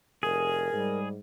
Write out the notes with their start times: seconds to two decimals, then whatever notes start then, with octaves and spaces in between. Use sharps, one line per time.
0.23 F1 G#4 A#4
0.73 G#2 G3